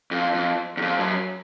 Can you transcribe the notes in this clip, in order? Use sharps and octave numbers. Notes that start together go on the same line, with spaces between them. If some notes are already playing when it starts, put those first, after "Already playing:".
F2
F2
E2
F2
F#2